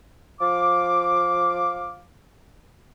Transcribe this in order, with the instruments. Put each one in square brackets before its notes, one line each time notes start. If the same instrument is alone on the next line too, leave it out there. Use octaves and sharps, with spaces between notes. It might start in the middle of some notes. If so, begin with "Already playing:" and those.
[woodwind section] F3 F5 D6